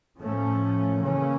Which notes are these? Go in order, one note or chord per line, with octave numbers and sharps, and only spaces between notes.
A2 F3 A3 C#4
C#3 E3 A#3 C#4